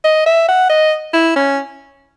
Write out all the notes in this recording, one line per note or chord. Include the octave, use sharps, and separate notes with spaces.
D#5
E5
F#5
D#5
E4
C#4